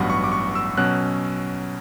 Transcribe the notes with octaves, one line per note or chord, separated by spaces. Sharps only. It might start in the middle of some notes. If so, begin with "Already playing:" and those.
Already playing: A1 G2 F#3 B3 F#5
C#6
D6
C#6
E6
B2 F#3 C#4 F#6